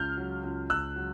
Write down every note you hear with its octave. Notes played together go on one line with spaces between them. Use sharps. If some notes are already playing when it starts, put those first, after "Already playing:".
Already playing: C#2 F6 G6
F#3
C#2
C#2 E6 F#6
F#3